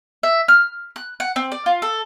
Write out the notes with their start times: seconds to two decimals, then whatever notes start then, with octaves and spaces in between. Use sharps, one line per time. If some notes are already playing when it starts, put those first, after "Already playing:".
0.23 E5
0.48 F6
0.96 F#6
1.20 F#5
1.36 C4
1.52 D5
1.66 F4
1.82 A4